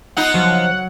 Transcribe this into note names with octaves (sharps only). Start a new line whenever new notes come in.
B3 D#4 F4 F#5
F3 F#3